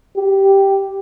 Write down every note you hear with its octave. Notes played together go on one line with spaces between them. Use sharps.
G4